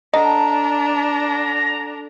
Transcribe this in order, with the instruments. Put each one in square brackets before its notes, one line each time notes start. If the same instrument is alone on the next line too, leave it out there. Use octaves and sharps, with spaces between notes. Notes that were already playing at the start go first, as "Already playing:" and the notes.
[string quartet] D4 [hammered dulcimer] A4 F#5 [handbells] D#5 [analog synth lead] A#5